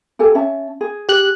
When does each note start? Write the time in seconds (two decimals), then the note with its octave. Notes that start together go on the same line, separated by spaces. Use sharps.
0.19 G4 A4 G#5
0.35 C#4 E5 A5
0.81 G#4
1.09 G4 F#6